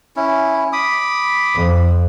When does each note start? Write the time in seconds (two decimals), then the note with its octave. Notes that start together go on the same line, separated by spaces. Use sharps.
0.16 C#4 E4
0.73 B5 D6 D#6
1.54 F2